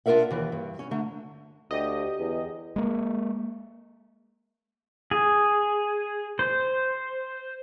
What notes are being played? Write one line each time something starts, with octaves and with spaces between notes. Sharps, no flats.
D4 F4 G4 A#4 E5 F#5
D#2 E3
G2
C#4
D3 A3 A#5
D2 G4 D#5
E2
G#3 A#3
G#4
C5